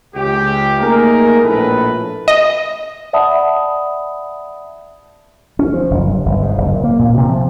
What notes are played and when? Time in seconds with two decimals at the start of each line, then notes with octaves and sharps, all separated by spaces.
0.15 C#2 G4
0.80 A3 A#3 D#4 G#4 A#4
1.43 A#1 A2 A4 B4
2.28 D#5
3.13 D5 E5 F#5 A5 B5 D#6
5.59 C#4
5.74 F3
5.91 F#1
6.08 G2
6.26 G1
6.42 G#2
6.58 F#1
6.72 A#2
6.84 A#3
6.99 A#2
7.17 C3
7.30 F3